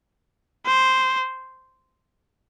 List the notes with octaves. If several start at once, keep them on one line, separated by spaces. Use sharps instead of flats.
C5